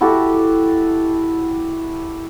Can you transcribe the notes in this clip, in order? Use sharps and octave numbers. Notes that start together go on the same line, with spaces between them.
E4 F#4 G4 A4